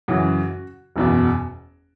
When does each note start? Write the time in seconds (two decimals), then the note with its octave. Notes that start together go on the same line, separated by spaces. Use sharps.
0.08 F#2 C#3 E3 F#4
0.96 F#1 E2 B2